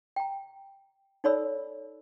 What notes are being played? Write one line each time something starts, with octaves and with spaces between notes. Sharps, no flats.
G5 A#5
D#4 A4 C#5 D5 B5 E6